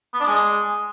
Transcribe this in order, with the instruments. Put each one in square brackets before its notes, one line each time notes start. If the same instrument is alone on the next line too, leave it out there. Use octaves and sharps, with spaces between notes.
[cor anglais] B3
D4
G#3